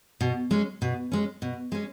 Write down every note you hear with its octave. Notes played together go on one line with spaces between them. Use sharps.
B2
G#3 C#4
B2
G#3 C#4
B2
G#3 C#4